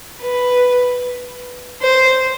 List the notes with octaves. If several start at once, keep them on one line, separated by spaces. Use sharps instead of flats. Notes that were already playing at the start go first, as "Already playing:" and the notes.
B4
C5